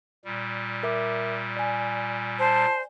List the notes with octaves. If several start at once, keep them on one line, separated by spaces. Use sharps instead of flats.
A#2 G3
A#4 E5 D6
D5 G#5
C5 A5